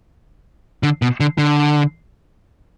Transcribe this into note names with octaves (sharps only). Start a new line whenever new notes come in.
D3
B2
D3
D3